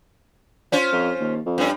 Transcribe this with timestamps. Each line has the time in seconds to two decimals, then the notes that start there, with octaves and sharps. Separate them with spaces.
0.72 C#4 F4 C5
0.92 F2
1.20 D#2
1.46 F2
1.58 G2 C#4